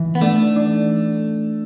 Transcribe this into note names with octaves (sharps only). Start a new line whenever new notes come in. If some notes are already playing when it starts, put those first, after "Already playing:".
Already playing: E3
B3
A3 D4
D4